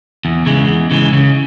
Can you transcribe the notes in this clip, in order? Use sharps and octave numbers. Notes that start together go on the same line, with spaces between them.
E2
C#3 E3 G#3
E2
C#3 E3 G#3
C#3